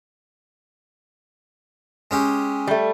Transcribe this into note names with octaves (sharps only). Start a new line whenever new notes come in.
G#3 C#4 G4
G3 A3